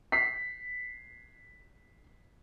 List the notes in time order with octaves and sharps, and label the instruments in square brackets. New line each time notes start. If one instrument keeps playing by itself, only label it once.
[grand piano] B6 C7